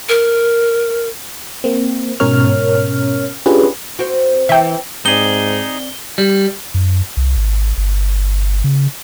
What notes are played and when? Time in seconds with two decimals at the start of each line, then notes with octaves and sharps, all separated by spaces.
0.09 A#4
1.64 A#3 C4
2.20 G#2 B2 C#4 A#4 C#5 F6
3.46 C#4 D4 F4 G4 G#4 B4
3.99 C4 F#4
4.49 E3 E5 G5
5.06 G#2 C4 D#4 G#4 D5 G7
6.18 G3
6.74 F#2
7.17 C2
7.37 G#1
7.78 G1
8.64 C#3